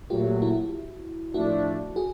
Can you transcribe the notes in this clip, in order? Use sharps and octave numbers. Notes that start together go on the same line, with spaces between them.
A#2 F#3 A3 F4 G4
E4 F#4
A2 F3 A3 D4 E4 F#4
F#4 G#4